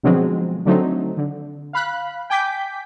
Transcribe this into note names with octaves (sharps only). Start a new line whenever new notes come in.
B2 D3 F3 F#3 G#3 C4
D3 F#3 A3 C4 D#4
D3
F5 B5 F#6
G5 G#5 D6 G6 B6